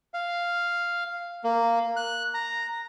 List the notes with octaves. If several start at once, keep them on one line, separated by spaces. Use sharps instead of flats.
F5
A#3
F#6
A#5